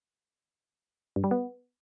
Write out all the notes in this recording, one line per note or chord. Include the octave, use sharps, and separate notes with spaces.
G2
G3
B3